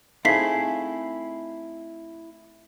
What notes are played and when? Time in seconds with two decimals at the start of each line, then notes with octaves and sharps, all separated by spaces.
0.25 A3 C4 D#4 E4 G#4 F5 B6 C7